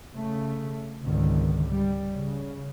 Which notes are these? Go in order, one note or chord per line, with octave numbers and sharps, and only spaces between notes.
C#3 A3
G#1 C#2 D3 D#3
G3
C#3